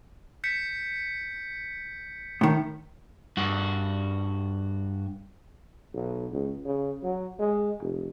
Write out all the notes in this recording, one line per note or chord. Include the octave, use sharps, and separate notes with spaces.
G6 B6 C#7
A2 D#3
G2 F#4
B1
C#2
C#3
F#3
G#3
F1